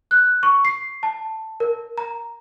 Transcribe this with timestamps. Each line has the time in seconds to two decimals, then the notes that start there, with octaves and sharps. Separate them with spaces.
0.11 F#6
0.43 C#6
0.65 C7
1.03 A5
1.60 A#4
1.98 A#5